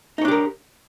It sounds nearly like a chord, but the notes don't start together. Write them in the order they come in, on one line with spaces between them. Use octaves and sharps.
D#4 C#5 D4 G4 A#4